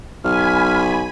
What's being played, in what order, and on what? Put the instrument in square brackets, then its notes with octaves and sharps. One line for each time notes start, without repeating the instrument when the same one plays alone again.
[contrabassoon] B1 [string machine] G#5 B5 [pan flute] F6